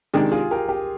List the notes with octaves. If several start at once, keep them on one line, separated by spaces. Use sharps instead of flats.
C3 D#3 G#3 D4 G4
F4 G#4
G4 A#4
G4 A#4